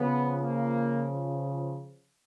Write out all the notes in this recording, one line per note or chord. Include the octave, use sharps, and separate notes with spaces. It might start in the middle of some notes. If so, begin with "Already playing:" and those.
Already playing: C#3 F3 B3
A#3